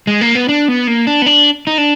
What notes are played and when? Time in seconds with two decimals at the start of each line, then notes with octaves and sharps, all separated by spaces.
0.07 G#3
0.21 A#3
0.35 B3
0.49 D4
0.68 B3
0.87 A#3
1.07 D4
1.22 B3
1.26 D4
1.67 D#4
1.78 D4